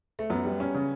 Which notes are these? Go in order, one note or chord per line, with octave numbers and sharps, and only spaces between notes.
A3
F#2 B3
G3
C#4
C#3